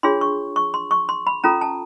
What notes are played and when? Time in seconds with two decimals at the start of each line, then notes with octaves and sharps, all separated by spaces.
0.03 D4 F4 G#4 C#5 C6
0.21 C#6
0.56 C#6
0.74 C6
0.91 C#6
1.09 C6
1.27 B5
1.44 C#4 F4 A4 A#5
1.61 A5